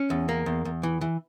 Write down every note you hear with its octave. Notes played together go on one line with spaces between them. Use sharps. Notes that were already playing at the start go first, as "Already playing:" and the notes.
Already playing: C#4
E2
A#3
E2
E2
E3
E3